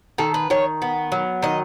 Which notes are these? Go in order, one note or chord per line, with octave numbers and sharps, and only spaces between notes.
D#3 A4
B4
D#3 C#5
B3
F#3
D#3 D#5